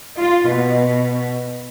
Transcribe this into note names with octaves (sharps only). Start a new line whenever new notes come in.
F4
B2